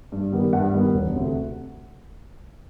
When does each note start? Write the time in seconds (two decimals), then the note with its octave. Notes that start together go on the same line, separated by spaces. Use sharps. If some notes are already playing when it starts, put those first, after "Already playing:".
0.12 G2
0.32 D#3 G3 B3
0.53 G2 F#5
0.74 D#3 G3 B3
0.94 E1
1.16 D2 C3